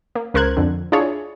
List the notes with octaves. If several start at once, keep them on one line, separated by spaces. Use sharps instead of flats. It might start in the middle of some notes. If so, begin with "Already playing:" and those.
A#3
C#2 A#4 C5 F#6 G#6
F2 D3
D4 E4 F4 G#4 C#5